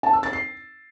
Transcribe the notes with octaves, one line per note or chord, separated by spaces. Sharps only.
A5
E6
A6
C7